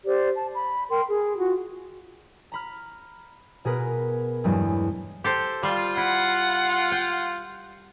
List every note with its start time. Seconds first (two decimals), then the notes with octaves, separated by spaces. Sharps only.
0.06 G4 C5 D5
0.34 A5
0.54 B5
0.90 A#4 G5 C6
1.08 G#4
1.36 F4 F#4
2.52 A#5 B5 F6
3.65 B2 G#4 A#4 B4
4.44 E2 G2 F#3 G#3 A3
5.24 G4 A4 C5
5.63 G3 F4 C5
5.97 E4 F#5
6.92 G5